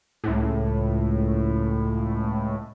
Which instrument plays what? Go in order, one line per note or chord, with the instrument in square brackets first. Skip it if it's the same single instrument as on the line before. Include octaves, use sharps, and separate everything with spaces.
[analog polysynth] C#2 A2